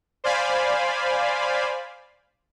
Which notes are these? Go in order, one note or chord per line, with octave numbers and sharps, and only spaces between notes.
C5 D5 F5 G#5 B5